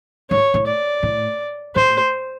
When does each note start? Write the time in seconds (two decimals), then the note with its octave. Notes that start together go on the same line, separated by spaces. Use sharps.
0.30 G#2 C#5
0.54 A2
0.67 D5
1.03 A2
1.75 A2 C5